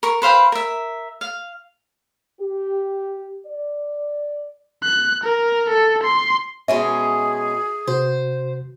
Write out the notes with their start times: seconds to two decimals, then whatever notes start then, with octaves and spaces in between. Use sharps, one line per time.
0.03 A#4 C#6
0.22 B4 C5 F5 G5
0.52 A#4 E5
1.21 F5
2.41 G4
3.47 D5
4.84 F#6
5.23 A#4
5.69 A4
6.03 C6
6.68 B2 G#3 C#4 G#4 E5
7.87 C3 F#4 C5